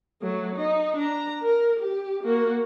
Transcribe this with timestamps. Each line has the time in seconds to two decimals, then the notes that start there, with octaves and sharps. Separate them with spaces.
0.21 F#3 A3
0.56 D#4
0.96 D4 A#5
1.42 A#4
1.80 G4
2.23 A#3 F#4